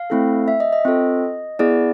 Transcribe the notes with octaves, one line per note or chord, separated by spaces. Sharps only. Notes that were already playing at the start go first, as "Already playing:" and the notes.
Already playing: F5
A3 C4 E4 A4
E5
D#5
D#5
C4 F4 A4
B3 E4 G#4 D5